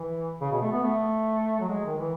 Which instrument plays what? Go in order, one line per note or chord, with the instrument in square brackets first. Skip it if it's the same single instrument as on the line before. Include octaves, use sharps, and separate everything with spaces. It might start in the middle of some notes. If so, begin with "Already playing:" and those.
Already playing: [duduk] E3
C#3
B2
A3
B3
A3
F#3
G#3
D#3
E3